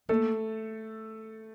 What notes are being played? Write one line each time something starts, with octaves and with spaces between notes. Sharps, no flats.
A3 A#3 A4